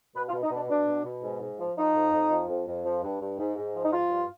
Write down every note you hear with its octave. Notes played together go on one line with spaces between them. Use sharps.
B2 B4
F4
B2
D#4
B2 D4
B2 D4
B2
B2
G#2
G#2
F3
F3 D#4
F2
F2
F3
F2
F2
F3
G2
G2
G#2
G#2
F3
D#4
F3 F4
G2